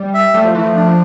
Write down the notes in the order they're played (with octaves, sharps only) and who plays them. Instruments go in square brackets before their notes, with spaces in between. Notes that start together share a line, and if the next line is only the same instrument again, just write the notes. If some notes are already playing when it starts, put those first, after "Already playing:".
Already playing: [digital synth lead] G3
[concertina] E5
[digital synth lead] G3 [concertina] A3
[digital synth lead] F3
[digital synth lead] E3 [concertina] A3
[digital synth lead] F3
[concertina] D4